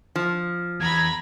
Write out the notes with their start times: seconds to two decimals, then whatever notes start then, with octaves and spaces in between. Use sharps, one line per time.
0.15 F3
0.80 E2 A#5 B5 G#6